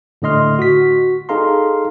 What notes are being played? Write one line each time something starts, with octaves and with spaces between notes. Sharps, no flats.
A2 D3 A3 D#5 C6 F6
F#4 B6
D#4 G#4 A4 F5 A#5 C6